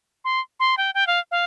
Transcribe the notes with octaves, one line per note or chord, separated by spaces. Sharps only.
C6
C6
G5
G5
F5
F5